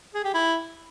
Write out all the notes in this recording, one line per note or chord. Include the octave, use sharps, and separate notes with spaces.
G#4
G4
E4